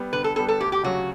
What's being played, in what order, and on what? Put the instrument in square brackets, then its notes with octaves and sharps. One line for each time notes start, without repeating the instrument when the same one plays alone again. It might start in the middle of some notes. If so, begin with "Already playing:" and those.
Already playing: [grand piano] G3 B3
[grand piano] D3 [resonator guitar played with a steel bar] B4
[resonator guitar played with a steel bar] A4
[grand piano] G3 B3 [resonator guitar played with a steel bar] A4
[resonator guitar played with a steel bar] A4
[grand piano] D2 [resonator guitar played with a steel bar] G4
[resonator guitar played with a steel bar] G4
[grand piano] C#3 F#3 [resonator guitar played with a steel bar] F#4